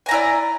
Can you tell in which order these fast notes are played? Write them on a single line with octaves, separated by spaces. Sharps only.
G#5 A#5 E4 D5